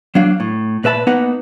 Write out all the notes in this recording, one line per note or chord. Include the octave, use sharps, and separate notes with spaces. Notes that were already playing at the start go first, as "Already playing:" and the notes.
F#3 A#3 D4 F5
A2
A#2 B4 E5 A5 B5
A#3 B3 D#4 B4 D#5 F#5